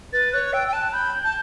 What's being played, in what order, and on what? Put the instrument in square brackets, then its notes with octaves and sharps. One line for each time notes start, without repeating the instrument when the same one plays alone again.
[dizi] B4 [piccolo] A6
[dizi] C#5 [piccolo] F#6
[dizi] G5 [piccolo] E6
[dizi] G5
[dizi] A5 [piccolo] F#6
[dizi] B5 [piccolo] G6
[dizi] A5